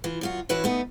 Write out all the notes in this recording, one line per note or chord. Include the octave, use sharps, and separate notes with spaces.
E3 F4
F#2 F4 F#4
E3 C#4 E4 F#4 B4 C#5
A3 B3 D#4